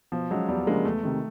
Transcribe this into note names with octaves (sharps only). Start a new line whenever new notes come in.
B2 F3
F#3 G#3 C#4
E2 G3
C#3 F3 G#3 A#3 D4
E2 A3
C3 D#3 G#3